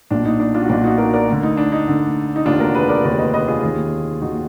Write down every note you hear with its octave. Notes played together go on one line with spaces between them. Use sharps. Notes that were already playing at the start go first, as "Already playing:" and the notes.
B1 A#2 D4
D#4
D4
D4 F4
F#4
B1 A#2 D4 F4
D#4 F#4
F#4 A#4
A#4 D5
D2 D3
D#4
D4
D#4
D2 D3
D#4
F1 D#2 D3 D4 F4
F#4 A#4
G#4 B4
A#4 D5
F1 D#2 D3 A#4 D5
B4 D#5
B4 D#5
F4 G#4
D#2 D#3
D#2 D#3 D#4 F#4